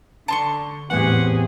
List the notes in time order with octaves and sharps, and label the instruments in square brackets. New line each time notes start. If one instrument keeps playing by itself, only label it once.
[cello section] D3 [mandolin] A5 C6 C#6
[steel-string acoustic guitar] E2 A2 [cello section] C4 G4 G#4 [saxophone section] F#5